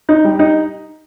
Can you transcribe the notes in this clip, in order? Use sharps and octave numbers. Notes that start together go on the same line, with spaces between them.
D#4
G3
D#4